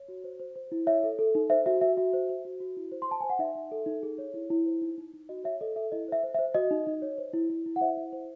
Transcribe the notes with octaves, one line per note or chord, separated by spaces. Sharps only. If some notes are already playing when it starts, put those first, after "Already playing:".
Already playing: C#5
F#4
C5
C5
C5
E4
C#5 E5
A4
A4
D#4
C5 E5
F#4 E5
F#4 E5
F#4 E5
C5
C5
F#4
F#4
E4
C5
C6
C5 A5
C5 G#5
F#5
D#4 E5
D#4
A4
D#4
G#4
C#5
E4
E4
C5
D#4
D#4
D#4
F#4 D#5
C#5 E5
A4 D#5
A4 E5
E4 D#5
C5 E5
C5
E5
C5
F#4 D#5
D#4
D#4
C#5
C5
E4
E4
E4
F#5
C5 E5
E4
C5